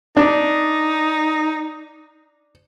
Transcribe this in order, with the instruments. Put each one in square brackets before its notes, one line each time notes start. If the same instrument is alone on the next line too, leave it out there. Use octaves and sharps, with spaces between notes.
[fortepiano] D4 [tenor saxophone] D#4